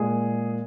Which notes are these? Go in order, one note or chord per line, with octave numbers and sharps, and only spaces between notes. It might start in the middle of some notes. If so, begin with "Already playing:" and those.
Already playing: A#2 G#3 G#4